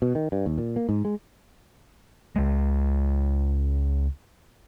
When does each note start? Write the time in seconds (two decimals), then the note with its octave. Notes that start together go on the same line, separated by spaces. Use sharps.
0.02 B2
0.15 D#3
0.32 G2
0.46 D#2
0.58 A#2
0.76 A#3
0.89 G#2
1.05 G#3
2.36 C#2 G#3